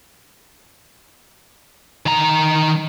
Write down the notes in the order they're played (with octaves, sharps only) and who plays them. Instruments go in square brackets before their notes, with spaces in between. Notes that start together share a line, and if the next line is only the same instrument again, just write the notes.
[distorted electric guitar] D#3 A#5